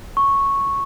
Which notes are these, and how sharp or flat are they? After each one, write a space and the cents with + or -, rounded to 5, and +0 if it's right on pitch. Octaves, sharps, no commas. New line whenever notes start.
C#6 -5